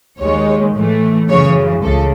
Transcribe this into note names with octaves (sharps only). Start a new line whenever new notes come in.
D#2 D#3 G#3 C#5
A2 E3 A3
F#2 C#3 E3 C#5
C#2 C#3 A4